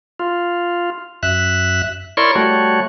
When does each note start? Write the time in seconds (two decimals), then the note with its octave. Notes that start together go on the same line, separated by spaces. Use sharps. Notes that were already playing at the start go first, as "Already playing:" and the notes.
0.19 F4
1.23 F#2 E5 F#6
2.17 E4 A#4 C#5 D5 C6 C#6
2.35 G3 A3 F#4 C#5